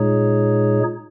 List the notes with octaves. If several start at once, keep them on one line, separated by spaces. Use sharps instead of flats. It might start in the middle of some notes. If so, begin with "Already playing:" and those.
Already playing: A#2 G#3 D#4 G#4 C#5